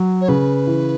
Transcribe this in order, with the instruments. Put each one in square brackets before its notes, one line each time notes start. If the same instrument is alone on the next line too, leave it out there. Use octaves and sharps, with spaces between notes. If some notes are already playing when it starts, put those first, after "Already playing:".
Already playing: [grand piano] F#3
[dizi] C#5
[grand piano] C#3 [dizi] B4
[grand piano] E3